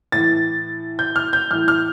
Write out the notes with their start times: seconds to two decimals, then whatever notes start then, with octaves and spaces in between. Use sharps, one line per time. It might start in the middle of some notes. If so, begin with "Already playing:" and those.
0.12 A2 E3 A6
0.99 G6
1.16 F6
1.33 G6
1.51 A2 E3 F6
1.68 F6